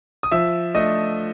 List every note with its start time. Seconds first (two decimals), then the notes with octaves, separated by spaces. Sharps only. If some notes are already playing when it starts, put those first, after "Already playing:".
0.23 D#6
0.32 F3 E5 E6
0.75 A3 D4 D#5 D#6